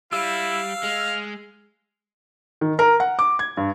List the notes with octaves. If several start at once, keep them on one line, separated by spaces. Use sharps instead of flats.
G3 E4 F5 E6
G#3 F6
D#3
A#4
F#5
D6
G#6
G2